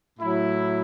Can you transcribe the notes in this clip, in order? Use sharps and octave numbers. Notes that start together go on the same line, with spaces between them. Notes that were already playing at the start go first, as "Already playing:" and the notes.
A2 F#3 E4